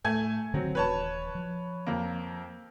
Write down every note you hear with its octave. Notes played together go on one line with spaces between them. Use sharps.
A2 A3 G#5 G#6
D3 D#3 F#3 A3 C4
D#1 E3 B4 C#5 A5
F3
F2 A#3